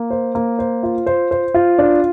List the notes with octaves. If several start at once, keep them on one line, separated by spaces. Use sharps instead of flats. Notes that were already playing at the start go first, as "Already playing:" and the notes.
Already playing: A#3
C5
A#3
C5
F4
C5
C5
F4
D4